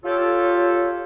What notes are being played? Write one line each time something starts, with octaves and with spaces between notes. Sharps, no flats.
F4 G4 A4 C#5